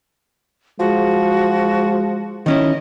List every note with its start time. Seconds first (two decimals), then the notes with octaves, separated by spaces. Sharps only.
0.79 F3 G#3 F#4
2.46 D#3 C#4 E4 D#5